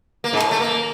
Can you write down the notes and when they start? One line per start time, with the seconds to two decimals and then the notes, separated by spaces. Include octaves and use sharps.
0.24 A#3
0.33 G#2
0.42 A2
0.51 A3
0.60 A#3